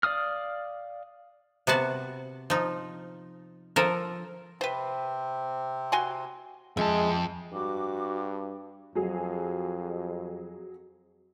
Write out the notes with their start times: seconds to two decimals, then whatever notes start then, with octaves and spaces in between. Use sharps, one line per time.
0.03 D5 F5 D#6 F6
1.67 C3 B3 F#4 A5
2.50 F3 D#4
3.76 F3 A4 A#4
4.61 C3 C4 B4 C5
5.92 F#4 G#5 C6
6.77 F2 G#3 E5 A5
7.52 G2 F#4 D6
8.95 F2 F#3 G#4